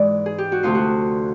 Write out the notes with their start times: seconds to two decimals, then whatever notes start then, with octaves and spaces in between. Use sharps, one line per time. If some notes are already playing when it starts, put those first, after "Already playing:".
Already playing: G#2 E3 G#3 D5
0.26 G#4
0.38 G4
0.52 F#4
0.63 D2 C3 F3 A3 F4
0.75 F#4